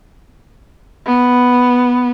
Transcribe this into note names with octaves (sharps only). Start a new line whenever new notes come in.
B3